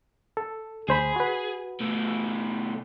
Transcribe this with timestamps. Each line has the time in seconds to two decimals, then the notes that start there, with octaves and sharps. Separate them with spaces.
0.37 A4
0.88 D2 G#4 C5 B5
1.16 F#4 B4
1.80 B2 A3